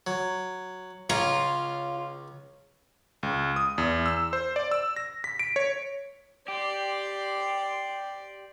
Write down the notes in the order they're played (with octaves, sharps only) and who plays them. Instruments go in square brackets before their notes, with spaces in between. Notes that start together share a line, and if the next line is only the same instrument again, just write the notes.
[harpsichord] F#3
[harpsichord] C#2 C#4 A#5 [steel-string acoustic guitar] F4
[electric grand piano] C#2
D#6
E2
E6
C5
D5
E6
A#6
B6
D7
C#5
[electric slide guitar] G4 [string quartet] D5 C6